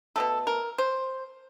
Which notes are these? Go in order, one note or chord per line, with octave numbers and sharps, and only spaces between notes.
B2 F#3 A3 A4
A#4
C5